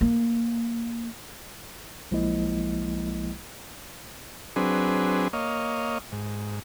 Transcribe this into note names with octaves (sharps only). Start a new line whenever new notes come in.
A#3
B1 F3 G#3 A#3 E4 D#5
F#3 C4 D4 G#4 B4
A#3 C#5 D#5 F5
G#2